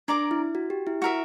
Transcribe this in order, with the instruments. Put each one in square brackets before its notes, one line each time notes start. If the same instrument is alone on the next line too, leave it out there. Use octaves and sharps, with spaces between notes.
[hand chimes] D4 [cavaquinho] A#4 D5 A#5 D6
[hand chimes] E4
F#4
G4
E4
[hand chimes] E4 [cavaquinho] F#4 A#4 E5